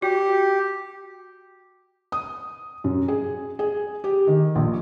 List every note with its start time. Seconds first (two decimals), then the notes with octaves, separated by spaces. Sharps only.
0.02 F#4 G4
2.12 D#6
2.84 F#2
3.08 G#4
3.59 G#4
4.04 G4
4.27 D#3
4.55 A#1